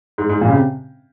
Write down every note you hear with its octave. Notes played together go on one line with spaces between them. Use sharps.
G#2
G#2
A#2
C#3
C3